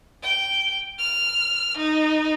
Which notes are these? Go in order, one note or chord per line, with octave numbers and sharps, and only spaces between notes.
G5
F6
D#4